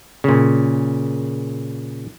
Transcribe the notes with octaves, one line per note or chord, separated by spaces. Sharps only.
A#2 C#3